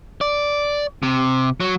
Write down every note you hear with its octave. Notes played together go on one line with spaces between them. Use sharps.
D5
C3
F#3